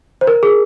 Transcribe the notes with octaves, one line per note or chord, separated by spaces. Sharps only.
C5
A#4
G#4